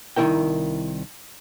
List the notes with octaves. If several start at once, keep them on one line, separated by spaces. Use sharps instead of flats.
C2 D#3 A3 E4 A#4 G5